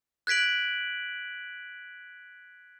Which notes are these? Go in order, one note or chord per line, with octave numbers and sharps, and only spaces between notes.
F#6 G#6 B6 D7 F#7